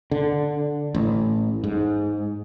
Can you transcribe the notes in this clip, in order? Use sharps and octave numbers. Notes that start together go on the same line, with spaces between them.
D3
A1
G#2